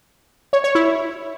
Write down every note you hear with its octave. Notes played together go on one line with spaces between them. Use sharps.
C#5
C#5
E4